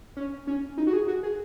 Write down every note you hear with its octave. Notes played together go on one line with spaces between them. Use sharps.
C#4
C#4
D#4
F#4
G#4
F#4
G#4